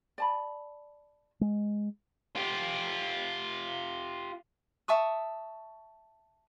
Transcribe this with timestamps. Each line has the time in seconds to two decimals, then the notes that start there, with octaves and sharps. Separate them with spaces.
0.18 D5 A5 B5
1.41 G#3
2.36 F4 G4
4.88 E5 A5 C#6 D#6